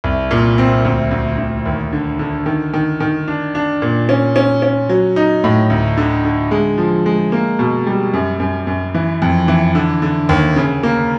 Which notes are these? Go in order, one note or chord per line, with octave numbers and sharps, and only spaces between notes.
C2
A#2
C4
D2
D2
D2
D#2
D3
D3
D#3
D#3
D#3
D4
D4
A#2
C#4
C#4
C#4
F#3
D#4
A2
D2
D3
D3
G#3
F3
G#3
A#3
B2
G3
F#2
F#2
F#2
E3
F2
E3
D3
D3
D#2
C#3
A#3